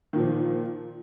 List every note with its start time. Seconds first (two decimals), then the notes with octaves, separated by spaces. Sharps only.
0.13 D#3
0.16 A#2
0.18 F3